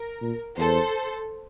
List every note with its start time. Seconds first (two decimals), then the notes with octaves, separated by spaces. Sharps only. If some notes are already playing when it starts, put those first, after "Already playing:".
Already playing: A#4
0.22 A#2
0.58 E2 A4 C5